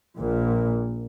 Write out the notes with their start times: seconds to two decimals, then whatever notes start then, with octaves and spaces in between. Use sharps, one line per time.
0.17 A#1 A#2